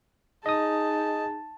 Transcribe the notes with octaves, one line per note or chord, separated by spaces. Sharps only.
D#4 G#4 D#5 A5 D#6